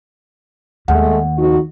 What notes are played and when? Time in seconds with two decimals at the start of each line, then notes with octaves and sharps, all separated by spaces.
0.88 D#2 G#3 A3 F#5
1.37 F2 D#4 F#4